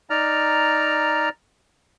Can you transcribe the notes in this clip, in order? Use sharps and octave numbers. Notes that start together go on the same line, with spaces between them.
D#4 D5 A#5 F6